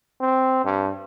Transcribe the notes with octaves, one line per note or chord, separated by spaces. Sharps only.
C4
G2